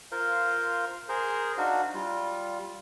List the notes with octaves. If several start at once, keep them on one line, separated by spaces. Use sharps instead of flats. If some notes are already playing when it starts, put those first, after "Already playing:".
F4 A#4 C5 F5
G#4 A#4 C5
D4 D#4 F#4 F5
G3 F4